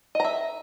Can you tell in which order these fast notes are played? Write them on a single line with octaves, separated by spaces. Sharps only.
D#5 A#5 E5